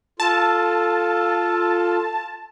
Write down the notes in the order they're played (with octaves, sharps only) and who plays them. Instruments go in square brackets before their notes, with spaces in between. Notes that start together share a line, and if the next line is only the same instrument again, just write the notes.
[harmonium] F4 A4 [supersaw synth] A5